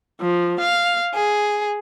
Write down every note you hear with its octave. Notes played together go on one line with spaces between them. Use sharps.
F3
F5
G#4